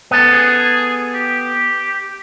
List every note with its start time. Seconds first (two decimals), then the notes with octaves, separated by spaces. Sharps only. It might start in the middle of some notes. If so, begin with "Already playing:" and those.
0.11 B3 A4
0.32 G#4
1.14 G4